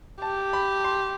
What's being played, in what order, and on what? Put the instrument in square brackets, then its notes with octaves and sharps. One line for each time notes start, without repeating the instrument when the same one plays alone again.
[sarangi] G4 [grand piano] A5
[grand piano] B5
C6